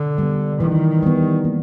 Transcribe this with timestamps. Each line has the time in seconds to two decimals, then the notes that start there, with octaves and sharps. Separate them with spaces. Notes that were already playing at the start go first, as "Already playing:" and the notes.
Already playing: D3
0.18 G3 B3
0.60 D#3 E3
1.03 G3 B3
1.44 A#3